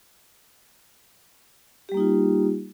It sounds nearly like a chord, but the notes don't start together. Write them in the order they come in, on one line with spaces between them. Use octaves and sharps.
G4 G3 A#3 D#4 F4